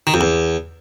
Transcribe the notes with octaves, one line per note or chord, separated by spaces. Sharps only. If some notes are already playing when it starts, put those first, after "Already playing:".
D#3
F2
E2